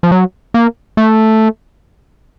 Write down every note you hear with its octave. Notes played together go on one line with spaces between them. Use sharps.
F3
F#3
A#3
A3